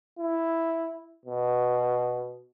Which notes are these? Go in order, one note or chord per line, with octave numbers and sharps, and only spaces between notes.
E4
B2